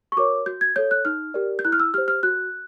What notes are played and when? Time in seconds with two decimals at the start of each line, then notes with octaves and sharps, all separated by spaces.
0.12 C#6
0.17 F#4 A#4 C#5 D6
0.46 F#4 G6
0.61 G#6
0.76 A4 C#5 G6
0.91 F#6
1.05 D#4 F6
1.34 G4 A#4 D5
1.59 G6
1.65 E4 F#6
1.72 F6
1.80 E6
1.94 G4 C5 F6
2.08 F6
2.23 F#4 F#6